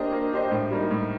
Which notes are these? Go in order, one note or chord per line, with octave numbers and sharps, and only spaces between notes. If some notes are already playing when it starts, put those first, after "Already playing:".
Already playing: A#3 D4 G4 C5 D#5
A#3
D4 G4 C5 D#5
A2
G3 A#3 D#4
A2